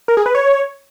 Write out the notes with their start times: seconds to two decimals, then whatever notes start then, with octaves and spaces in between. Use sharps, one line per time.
0.08 A#4
0.17 G#4
0.26 B4
0.35 C#5